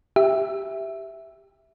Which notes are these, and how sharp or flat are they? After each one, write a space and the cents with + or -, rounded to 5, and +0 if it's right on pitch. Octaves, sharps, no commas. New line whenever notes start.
G4 +0 E5 +0